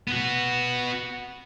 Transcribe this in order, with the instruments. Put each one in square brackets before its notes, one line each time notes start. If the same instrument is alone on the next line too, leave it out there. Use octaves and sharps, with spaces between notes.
[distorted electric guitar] B3 F#4